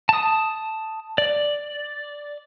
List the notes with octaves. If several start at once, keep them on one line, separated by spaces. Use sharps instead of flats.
A5 D#6
D5